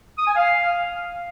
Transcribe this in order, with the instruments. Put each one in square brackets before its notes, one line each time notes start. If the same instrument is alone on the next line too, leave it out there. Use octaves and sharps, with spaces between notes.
[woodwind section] D#6
G#5
F5